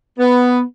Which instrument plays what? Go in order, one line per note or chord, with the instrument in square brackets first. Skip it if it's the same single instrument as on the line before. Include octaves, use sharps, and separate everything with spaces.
[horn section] B3